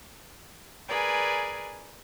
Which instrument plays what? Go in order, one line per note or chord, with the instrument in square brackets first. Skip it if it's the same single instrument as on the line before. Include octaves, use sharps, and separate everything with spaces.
[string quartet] G#4 A#4 B4 D5 G#5